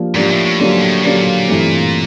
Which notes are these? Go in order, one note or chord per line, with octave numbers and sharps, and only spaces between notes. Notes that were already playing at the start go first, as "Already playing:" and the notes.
Already playing: F3 A#3 D4 G4
G#2 F3 A#3 D4 G4
A2
A2
G#2 D3 F#3 A#3 D4 G4
A2
A#2 D3 F#3 A#3 D4 G4
G2 E3 A3 C4